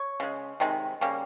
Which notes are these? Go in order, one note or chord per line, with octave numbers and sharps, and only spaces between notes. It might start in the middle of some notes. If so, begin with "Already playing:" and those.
Already playing: C#5
C#3 G#3
C3 D#3 G#3
C#3 G3 A#3